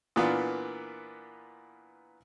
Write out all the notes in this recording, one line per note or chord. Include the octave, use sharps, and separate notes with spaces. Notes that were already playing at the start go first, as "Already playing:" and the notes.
A#2 E3 A#3 B3 D4 F4